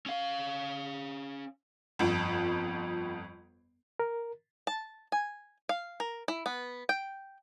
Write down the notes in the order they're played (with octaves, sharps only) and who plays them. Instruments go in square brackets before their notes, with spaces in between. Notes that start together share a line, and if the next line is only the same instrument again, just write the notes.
[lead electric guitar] C#4 F5
[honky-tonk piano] G1 F2
[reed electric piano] A#4
[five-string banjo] A5
G#5
F5
A#4
E4
B3
G5